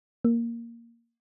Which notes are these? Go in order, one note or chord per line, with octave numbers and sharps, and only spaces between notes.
A#3